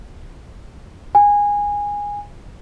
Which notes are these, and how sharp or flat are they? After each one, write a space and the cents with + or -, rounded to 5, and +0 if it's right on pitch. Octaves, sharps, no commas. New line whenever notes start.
G#5 -15